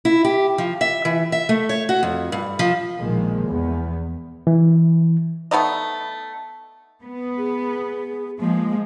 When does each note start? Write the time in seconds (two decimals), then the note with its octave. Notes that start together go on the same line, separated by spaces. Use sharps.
0.05 E4
0.24 G4
0.58 F3
0.81 E5
1.05 E3
1.32 E5
1.49 A3
1.69 C#5
1.89 F#4
2.03 F2
2.32 G2
2.59 F3
2.99 A#1 B2 D#3 F3 G#3 A#3
3.47 E2 B3
4.47 E3
5.51 A3 B3 D#4 D#5
7.02 B3
7.38 G#4
8.39 F3 G#3 A#3